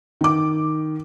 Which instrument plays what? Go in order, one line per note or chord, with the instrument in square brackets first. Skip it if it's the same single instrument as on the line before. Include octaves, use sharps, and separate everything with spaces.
[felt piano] D#3 D6